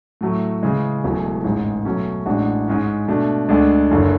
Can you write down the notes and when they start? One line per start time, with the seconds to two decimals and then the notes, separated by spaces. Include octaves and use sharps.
0.21 A2 F#3 A3
0.63 C#3 E3 G#3
1.04 E1 E2 B2 F#3 A3
1.44 A1 G#2 G#3
1.85 B2 F#3 A3 C#4
2.26 A1 A2 G#3 D4 F#4
2.68 G#2 G#3 C#4
3.08 B2 A3 D4
3.49 D2 D3 G#3 D4
3.91 F#1 F#2 D3